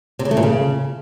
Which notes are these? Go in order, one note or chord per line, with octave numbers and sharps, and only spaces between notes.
C3
C#3
A3
A#2
C#3